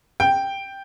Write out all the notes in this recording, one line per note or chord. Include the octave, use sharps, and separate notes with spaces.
G5